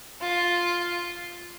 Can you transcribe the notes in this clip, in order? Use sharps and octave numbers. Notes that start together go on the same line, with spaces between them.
F4